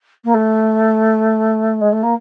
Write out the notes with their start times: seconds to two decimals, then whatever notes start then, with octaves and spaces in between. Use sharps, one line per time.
0.24 A#3
0.34 A3
1.81 G#3
1.92 A3
2.02 A#3